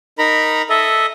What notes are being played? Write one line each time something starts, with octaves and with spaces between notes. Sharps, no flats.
D#4 A#4 A#5 B5
A4 D#5 E5